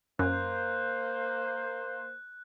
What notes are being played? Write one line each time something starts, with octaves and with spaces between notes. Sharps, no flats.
F#2 A#3 C5 F#6